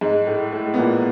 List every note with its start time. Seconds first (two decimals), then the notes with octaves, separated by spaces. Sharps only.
0.01 G#2 G#3
0.27 A2 A3
0.52 A2 A3
0.74 B3
0.78 A#2 A#3